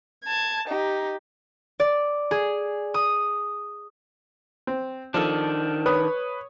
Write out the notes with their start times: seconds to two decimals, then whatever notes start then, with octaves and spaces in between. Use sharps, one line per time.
0.24 A5 G#6
0.68 D#4 G4
1.80 D5
2.31 G#4
2.94 D#6
4.67 C4
5.14 D#3 F3 D4 A4
5.86 B4 C#5 D#6